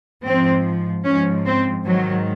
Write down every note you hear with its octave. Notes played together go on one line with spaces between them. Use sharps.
G#2 F3 C4
G#2 F3 C#4
C4
G#2 D#3 F#3